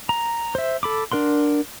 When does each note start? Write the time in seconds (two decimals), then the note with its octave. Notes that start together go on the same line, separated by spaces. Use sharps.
0.09 A#5
0.55 C5 E5
0.83 A4 B5 D6
1.12 D4 A#4 F#5 C6